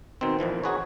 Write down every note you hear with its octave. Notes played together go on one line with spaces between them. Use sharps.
B2 D#3 C4
F2 A#2 E3 F3
D#4 F#4 G#4 B4 C#5